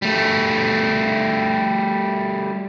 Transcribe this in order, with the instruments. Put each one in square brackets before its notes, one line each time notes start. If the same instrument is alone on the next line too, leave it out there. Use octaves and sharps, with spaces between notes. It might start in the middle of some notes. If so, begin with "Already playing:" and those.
[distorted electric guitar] G3 A3